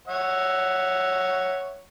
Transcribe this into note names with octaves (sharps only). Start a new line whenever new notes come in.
C#5 E5 F#5